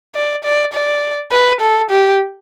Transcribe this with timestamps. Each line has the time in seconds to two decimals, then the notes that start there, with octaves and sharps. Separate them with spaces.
0.15 D5
0.44 D5
0.73 D5
1.32 B4
1.61 A4
1.91 G4